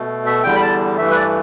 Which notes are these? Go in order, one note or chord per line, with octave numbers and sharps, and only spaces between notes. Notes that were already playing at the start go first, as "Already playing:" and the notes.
Already playing: B2 A3
E5
E2 D3 G3 G5
B5
A5
G2 E3 A3 E5
B4
D5